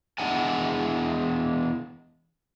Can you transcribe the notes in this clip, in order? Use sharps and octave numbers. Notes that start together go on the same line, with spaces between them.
E2 G#3 D4 E4 F#5 G#5